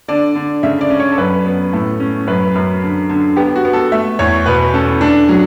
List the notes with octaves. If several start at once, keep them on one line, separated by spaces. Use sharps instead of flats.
D3 D5
D3
C#3 E5
D5
C#4
C#5
A4
F#2 B4
B3
A2 A4
C#4
F#2 B4
F#2
D3
D3
B3 G4
F#4
B3
A4
A3 E5
E2 C#5
B2 B4
C#4 A4
D4 A4
F#3